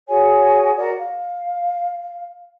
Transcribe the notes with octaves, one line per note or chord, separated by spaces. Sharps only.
F#4 G#4 C#5 G#5
F#4 A#4 D5
F5